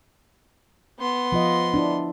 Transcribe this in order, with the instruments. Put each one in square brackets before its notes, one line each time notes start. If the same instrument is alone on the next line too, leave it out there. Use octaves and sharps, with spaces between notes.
[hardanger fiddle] B3 C6
[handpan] F3 F4 D#5
D4 E4